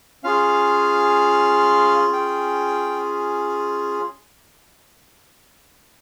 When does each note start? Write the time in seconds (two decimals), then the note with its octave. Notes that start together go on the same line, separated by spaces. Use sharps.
0.24 C#4 F4 G#4 F5
2.13 G5